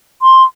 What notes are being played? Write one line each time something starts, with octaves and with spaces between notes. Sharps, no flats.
C6